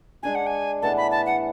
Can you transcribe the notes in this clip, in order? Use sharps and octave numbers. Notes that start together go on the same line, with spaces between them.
G#3 D4 G#4 G#5
F#5
G#5
A2 E3 B3 D4 A5
B5
A5
F#5